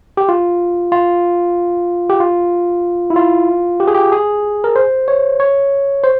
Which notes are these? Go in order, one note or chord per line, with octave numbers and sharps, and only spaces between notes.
G4
F4
F4
G4
F4
E4
F4
G4
G#4
G4
G#4
A#4
C5
C#5
C#5
C5